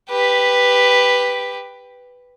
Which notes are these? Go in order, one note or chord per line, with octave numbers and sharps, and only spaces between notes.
G4 B4